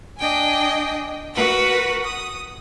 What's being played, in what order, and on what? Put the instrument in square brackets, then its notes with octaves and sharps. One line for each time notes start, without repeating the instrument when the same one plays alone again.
[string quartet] D4 D#5 G5 G#5
F#4 A#4 B4 F#5
D#6